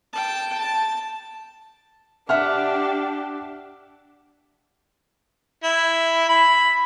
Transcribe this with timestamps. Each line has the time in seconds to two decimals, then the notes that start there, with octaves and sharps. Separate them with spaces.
0.13 G5 A5
0.58 A5
2.29 D4 G4 E5 F#5 F6
5.63 E4
6.29 B5